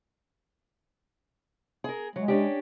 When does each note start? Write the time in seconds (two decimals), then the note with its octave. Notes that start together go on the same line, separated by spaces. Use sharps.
1.84 G#4 A#4
2.16 F#3 G#3
2.28 C#4 D4 G4